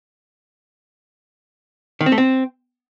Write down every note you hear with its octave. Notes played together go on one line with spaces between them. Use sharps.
D#3
C4
A3
C4